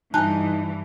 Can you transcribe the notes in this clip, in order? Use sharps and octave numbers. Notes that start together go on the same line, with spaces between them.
G2 E3 D#4 D#5 G#5 A5 F#6